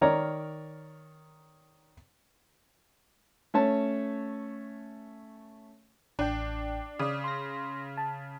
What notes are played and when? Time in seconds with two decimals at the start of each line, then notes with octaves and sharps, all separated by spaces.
0.01 D#3 A#4 C#5 D5 A#5
3.54 A3 C#4 C#5 A5
6.19 A1 D4 G5
6.99 C#3 D5 D#6
7.24 C6 A#6
7.97 A5